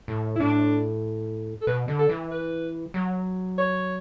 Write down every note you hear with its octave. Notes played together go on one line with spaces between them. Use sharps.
A2
E4
A2 D4
A4
B2 B4
D3
A4
E3
B4
F#3
C#5